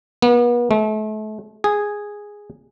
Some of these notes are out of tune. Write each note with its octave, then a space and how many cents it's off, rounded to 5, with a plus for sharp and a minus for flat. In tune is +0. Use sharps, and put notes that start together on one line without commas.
B3 -40
A3 -35
G#4 -5